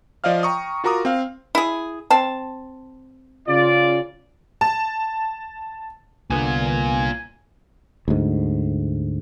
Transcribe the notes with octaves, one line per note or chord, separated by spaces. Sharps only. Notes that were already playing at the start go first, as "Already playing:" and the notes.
F3 D5 D#5 F5 F6
G5 A#5 C#6 D#6
F4 F#4 A#4 A#5 D6 D#6
C4 F5 F6
E4 G#4
C4 A5
C#3 F4 D5
A5
C2 D3 A#3 B3 F4 G#5
D2 G#2